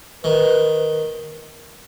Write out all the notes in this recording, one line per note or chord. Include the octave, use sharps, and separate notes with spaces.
D#3 B4